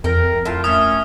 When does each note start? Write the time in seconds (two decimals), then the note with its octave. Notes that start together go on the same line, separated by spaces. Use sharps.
0.04 F2 A3 A#4 G5
0.45 A2 F4 A5
0.64 A3 C#4 E5 A5 D#6 F6